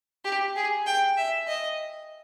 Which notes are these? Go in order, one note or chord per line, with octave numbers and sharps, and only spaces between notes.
G4
G#4
G5
E5
D#5